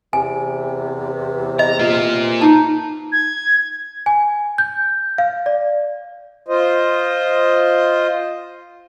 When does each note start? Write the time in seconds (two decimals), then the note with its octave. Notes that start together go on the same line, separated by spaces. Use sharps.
0.13 E2 C3 G#5
1.59 D#5 A#5
1.79 A#3 F4
2.41 D#4 A5
3.12 G#6
4.06 G#5
4.58 G6
5.18 F5
5.46 D5
6.47 F4 C5 D#5